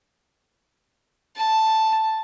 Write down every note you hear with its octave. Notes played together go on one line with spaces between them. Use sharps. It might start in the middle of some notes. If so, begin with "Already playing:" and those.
A5